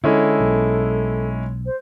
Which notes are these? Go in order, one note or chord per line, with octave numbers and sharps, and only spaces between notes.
D3 G#3 C#4 E4 A4
B1
C5